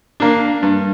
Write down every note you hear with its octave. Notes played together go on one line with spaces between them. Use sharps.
A#3 D4
G2